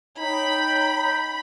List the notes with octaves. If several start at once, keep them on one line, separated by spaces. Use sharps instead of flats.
D#4 C#5 G5 A#5 B5